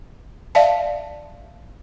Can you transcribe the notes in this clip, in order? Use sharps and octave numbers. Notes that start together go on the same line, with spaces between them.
D5 E5 F5 A5